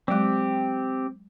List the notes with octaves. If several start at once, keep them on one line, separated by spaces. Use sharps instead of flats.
F#3 G#3 C4 G4